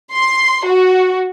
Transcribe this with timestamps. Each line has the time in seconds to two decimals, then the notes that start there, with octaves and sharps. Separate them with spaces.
0.13 C6
0.68 F#4